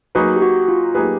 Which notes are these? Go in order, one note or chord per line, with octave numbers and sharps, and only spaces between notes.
F#3 A#3 D#4 F#4 G#4 B4
G4
F#4
F4
F#3 A#3 D#4 G4 G#4 B4